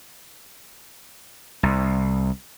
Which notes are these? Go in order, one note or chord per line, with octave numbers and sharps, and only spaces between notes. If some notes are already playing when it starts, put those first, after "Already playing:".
C2